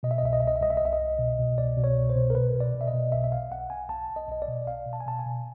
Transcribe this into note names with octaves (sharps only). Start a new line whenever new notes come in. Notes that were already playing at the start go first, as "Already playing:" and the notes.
B2 D#5
E5
D#5
C2 E5
D#5
C2 E5
D#5
E5
C2 D#5
E5
D#5
C2 E5
D#5
C2
B2
B2
C2 D5
B2
C#5
C2
C5
B2
A#4
B2 B4
B2
D5
B2
E5
D#5
B2
B1 E5
E5
B1 F5
B1 F#5
B1 G#5
B1 A5
B1
D#5
B1 D#5
D5
B2
B1 F5
B2
A5
G#5
B2 A5
G#5
B2